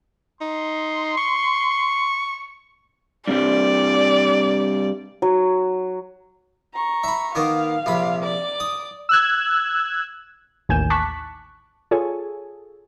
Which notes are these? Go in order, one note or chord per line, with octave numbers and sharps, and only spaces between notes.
D#4 C6
C#6
G2 C3 G3 D5
F#3
A#5 C#6
E5 B5
D#3 A#3 B3 F5
A#1 C3 B5
D5 D6
D#6
E6 F#6 G#6
A1 D#2 G#5 G6 E7
A5 C#6 D6 F#6 B6
F4 G#4 A4 C#5 G#5